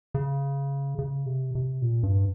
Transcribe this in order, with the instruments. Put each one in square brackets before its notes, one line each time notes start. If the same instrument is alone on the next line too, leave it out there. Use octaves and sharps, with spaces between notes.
[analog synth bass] C#3
C#3
C3
C3
A#2
G2